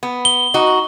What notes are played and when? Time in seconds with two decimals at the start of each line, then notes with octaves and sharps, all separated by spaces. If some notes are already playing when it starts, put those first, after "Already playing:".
0.03 B3
0.25 G7
0.54 D#4 F#4